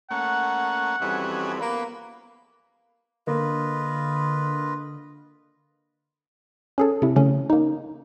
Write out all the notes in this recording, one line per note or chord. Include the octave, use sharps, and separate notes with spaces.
A3 A#3 C#4 F#5
F2 E3 G3 C#4 F#4 G#4
A#3 B3
D3 A#3 F4 B4 D#5
C#4 G#4 A4
C3 E4
C#3 A3 C#4
A#3 D#4